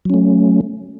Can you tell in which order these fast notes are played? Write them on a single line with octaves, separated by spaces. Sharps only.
F#3 C#4 A3